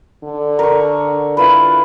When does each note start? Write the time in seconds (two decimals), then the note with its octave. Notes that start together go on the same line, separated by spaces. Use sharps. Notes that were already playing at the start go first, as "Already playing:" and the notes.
0.24 D3
0.59 A#4 C#6
1.37 E4 F4 B4